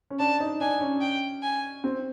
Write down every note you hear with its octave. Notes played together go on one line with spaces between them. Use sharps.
C#4
D4 A5
D#4
D4 G#5
C#4
G5
G#5
C4